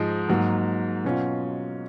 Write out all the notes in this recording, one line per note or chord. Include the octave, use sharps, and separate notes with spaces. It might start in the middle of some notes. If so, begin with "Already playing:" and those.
Already playing: G#2 F3 G#3 D#4
G#2 F#3 A#3 D#4
B2 F#3 C#4 F4